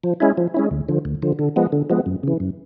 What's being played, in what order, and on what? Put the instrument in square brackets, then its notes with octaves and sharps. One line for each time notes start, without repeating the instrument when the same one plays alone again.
[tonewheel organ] F3
G#3 C#4 E4
F3
G#3 C#4 E4
D2
D3 F3
D2
D3 F3
D3
F3 G#3 B3
D3
F3 G#3 B3
F#2
C#3 E3
F#2